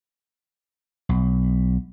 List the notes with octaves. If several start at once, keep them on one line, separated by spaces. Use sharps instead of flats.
B1